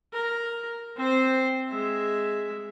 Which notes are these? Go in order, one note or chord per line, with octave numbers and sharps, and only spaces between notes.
A#4
C4 C5
G#3 E5